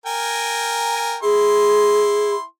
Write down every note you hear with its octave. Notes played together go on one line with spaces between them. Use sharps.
A#4 G5 G#5
E4 G#4 C6